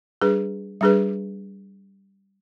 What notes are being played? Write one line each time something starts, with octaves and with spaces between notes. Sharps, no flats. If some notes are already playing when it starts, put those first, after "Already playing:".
G3 D4 G#4 B4
G3 D4 G#4 B4